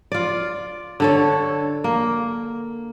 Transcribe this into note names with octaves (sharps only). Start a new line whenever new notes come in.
F4 D5
D3 A4 C#5
A#3